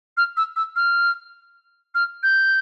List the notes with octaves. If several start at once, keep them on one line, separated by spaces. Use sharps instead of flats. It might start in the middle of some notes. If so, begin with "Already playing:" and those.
F6
E6
E6
F6
F6
G6